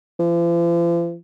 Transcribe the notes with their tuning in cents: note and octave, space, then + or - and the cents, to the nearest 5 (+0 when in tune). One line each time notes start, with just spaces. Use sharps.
F3 -45